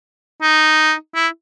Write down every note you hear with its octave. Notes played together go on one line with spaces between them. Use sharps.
D#4
E4